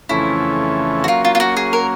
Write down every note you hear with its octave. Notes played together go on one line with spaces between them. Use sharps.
F2 C#3 E3 A3 C#4 E4
F#4
F#3 A#3 C#4 F4
F4
F4
F#4
G#4
A#4